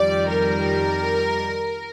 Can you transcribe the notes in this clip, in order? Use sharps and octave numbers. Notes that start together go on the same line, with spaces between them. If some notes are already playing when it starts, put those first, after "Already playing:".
Already playing: F2 D#3 G3 D5
A#4